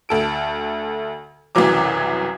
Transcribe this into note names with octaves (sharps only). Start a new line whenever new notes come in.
D2 A4 D7
C2 F#2 C#3 E3 F#3 D6